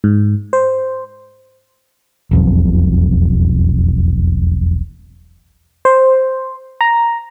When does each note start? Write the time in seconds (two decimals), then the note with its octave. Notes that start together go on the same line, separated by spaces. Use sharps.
0.04 G#2
0.53 C5
2.31 E1 B1 F2
5.85 C5
6.81 A#5